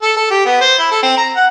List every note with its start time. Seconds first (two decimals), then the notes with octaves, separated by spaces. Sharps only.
0.02 A4
0.17 A4
0.30 G4
0.46 B3
0.61 C5
0.79 E4
0.91 A4
1.03 C4
1.17 A#5
1.36 F#5